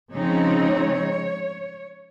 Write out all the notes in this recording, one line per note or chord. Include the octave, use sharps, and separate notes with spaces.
C#3 F3 G#3 C4 D#4 C#5